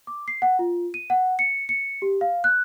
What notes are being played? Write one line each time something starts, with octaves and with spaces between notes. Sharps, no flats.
D6
C7
F#5
F4
D#7
F#5
C#7
C#7
G4
F5
F#6